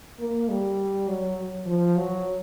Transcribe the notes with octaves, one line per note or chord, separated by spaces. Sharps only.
A#3
G3
F#3
F3
F#3